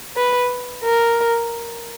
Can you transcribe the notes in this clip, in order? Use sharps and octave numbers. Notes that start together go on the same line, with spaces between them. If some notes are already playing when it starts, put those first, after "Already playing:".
B4
A#4